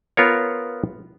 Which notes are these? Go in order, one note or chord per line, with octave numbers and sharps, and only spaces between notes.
B3 F4 A#4 C#5